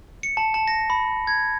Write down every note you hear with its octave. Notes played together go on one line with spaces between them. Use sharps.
C#7
A5
A5
A#6
B5
G#6